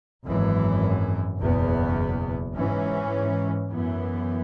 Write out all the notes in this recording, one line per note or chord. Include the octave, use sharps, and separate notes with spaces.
G#1 F#2 E3
F#1 E2 B2 B3
G#2 E3 C#4
F#2 E3 B3